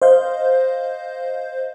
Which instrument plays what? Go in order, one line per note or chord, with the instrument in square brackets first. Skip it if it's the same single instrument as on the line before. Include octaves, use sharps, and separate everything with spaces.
[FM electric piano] C5 D#5 F5 G6